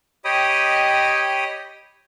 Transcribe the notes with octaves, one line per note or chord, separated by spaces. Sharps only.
G4 C#5 D#5 G5 B5 D#6